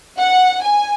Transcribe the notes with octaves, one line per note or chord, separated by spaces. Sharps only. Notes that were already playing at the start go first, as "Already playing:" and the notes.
F#5
G#5